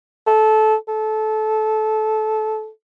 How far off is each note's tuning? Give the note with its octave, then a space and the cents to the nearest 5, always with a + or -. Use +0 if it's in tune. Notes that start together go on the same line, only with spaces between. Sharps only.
A4 -20
A4 -20